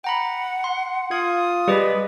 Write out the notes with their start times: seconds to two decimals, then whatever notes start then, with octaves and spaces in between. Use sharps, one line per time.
0.04 F#5 G5 A#5 B5
0.64 C6
1.11 F4 F5 D#6 G#6
1.68 G3 G4 G#4 B4 D#5